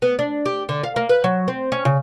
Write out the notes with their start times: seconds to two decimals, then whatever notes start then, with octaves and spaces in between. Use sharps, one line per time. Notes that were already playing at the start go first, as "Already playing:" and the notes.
0.02 B3
0.19 D4
0.45 G4
0.69 D3
0.83 F5
0.96 A#3
1.09 B4
1.24 F#3
1.48 C4
1.72 C#4
1.85 C#3